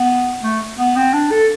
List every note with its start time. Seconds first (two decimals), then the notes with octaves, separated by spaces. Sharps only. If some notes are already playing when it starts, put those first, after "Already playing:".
Already playing: B3
0.43 A3
0.78 B3
0.96 C4
1.13 D4
1.31 A4